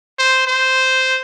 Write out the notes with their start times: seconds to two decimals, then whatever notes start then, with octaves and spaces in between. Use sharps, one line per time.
0.18 C5
0.47 C5